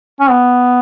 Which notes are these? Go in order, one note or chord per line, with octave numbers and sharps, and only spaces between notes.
C#4
B3